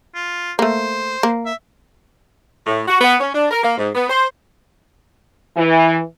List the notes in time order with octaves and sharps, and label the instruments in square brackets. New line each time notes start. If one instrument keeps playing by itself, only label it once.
[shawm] F4
[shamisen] A3 A#3 [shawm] C5
[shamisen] A#3
[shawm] E5
[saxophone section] A2
F#4
B3
C#4
D4
A#4
A#3
G#2
B3
C5
[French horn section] E3